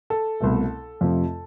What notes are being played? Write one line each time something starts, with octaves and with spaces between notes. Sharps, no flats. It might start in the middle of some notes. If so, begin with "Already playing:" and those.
A4
C2 B2 A3
F2 C3 F3 A3